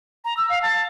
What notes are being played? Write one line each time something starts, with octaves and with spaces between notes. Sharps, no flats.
A#5
E6
F5
A5